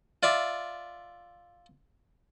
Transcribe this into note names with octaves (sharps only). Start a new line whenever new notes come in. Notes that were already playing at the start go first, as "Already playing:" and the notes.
F4 D5 E5